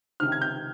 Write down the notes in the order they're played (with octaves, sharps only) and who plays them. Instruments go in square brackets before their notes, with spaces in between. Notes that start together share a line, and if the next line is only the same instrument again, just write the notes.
[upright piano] C#2 C3 D#3 F6
G#6
G6